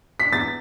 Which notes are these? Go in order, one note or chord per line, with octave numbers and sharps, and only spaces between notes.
B6
E2 A6